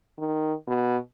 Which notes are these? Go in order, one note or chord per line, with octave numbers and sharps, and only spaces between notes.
D#3
B2